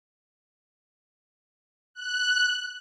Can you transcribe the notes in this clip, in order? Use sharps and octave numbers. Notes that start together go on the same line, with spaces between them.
F#6